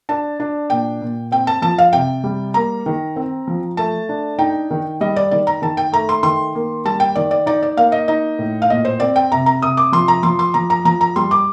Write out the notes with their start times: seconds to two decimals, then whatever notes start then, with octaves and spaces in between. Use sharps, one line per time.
0.09 D4 A5
0.40 D4
0.70 A#2 G5
1.02 A#2
1.32 C4 G5
1.47 A5
1.62 F3 A5
1.78 F5
1.93 C3 G5
2.24 G3
2.54 A#3 A#5
2.86 D#3
3.16 C4
3.47 F3
3.77 A3 A5
4.09 D4
4.39 D#4 G5
4.71 D#3
5.01 G3 D#5
5.16 D5
5.31 D#3 D5
5.47 A#5
5.62 D#3 A5
5.77 G5
5.92 A3 A#5
6.09 C6
6.23 D#3 C6
6.55 A#3
6.85 G3 A5
7.00 G5
7.16 D#3 D5
7.31 D5
7.46 D#4 D5
7.63 D5
7.77 A#3 F5
7.92 D#5
8.08 D#4 D#5
8.39 A2
8.62 F5
8.70 A#2 D#5
8.85 C5
9.00 C4 D5
9.16 G5
9.32 C3 A#5
9.46 A#5
9.62 C3 D#6
9.77 D6
9.92 F3 C6
10.08 A#5
10.23 F3 C6
10.39 C6
10.54 F3 A#5
10.70 A#5
10.85 F3 A#5
11.01 A#5
11.16 G3 C6
11.31 D6